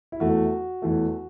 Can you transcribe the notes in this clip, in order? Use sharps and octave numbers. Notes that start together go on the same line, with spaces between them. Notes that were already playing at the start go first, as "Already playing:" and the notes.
E4
E2 E3 A3 F#4
E2 E3 A3